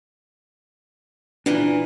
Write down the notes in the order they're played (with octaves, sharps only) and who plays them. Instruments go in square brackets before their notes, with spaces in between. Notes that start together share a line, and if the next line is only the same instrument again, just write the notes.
[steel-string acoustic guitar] A#2 E3 [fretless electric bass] D4